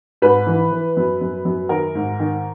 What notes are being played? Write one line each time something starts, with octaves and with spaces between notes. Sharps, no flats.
G#2 B4
E3
E3
F#2
F#2
F#2
D#3 A#4
G#2
D#3